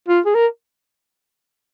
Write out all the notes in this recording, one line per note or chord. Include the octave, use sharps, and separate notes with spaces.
F4
G#4
A#4